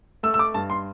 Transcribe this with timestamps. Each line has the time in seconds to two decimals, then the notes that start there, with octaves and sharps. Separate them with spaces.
0.23 A3 E6
0.34 E6
0.39 D6
0.54 G2 A5
0.70 C6